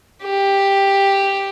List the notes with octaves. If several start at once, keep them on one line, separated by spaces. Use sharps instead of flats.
G4